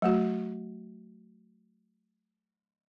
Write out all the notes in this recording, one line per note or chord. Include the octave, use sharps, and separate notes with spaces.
F#3 A3 F#4